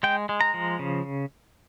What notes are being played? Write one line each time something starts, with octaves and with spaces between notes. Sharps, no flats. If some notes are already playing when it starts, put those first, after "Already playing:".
G#3 G5
G#3
A#5
F3
C#3